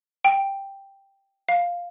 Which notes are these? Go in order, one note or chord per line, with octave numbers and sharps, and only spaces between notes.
G5
F5